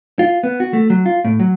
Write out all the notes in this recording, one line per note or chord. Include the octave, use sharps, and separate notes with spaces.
F4
B3
F#4
A3
F#3
F4
A2
F#3